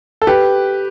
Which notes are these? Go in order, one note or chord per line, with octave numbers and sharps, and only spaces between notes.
A4
G4 B4